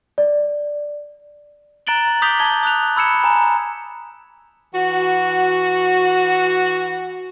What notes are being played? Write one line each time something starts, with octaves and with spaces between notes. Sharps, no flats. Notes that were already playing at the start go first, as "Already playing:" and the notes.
D5
A#5 F#6 A6 D7 F#7 G7
D6 D#6 G6 B6 F7 G7
A5 G#6 G7
D#6 F#6 F7
B5 E6 G#6 C#7 E7
G#5 A#5
E3 F#4